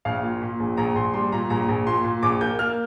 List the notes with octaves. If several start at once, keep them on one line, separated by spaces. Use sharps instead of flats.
A#1 F5
A#2
A#2
A#1
A#1 A#5
A#1 C6
G3 C6
A#2 A#5
A#1 A#5
A#1
A#2 C6
A#2
A#1 D6
A#3 G6
A#3 F6